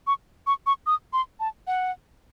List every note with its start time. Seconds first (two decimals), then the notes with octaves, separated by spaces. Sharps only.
0.07 C#6
0.47 C#6
0.67 C#6
0.87 D#6
1.13 C6
1.40 A5
1.67 F#5